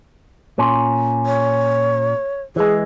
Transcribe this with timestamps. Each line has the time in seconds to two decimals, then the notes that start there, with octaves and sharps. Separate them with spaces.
0.58 A#2 C#4
1.26 C#5
2.56 E3 G#3 G#4